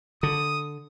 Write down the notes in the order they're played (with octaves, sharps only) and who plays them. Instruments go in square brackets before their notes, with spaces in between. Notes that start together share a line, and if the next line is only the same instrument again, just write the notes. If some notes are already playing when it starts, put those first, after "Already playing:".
[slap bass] D3 [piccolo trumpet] D#6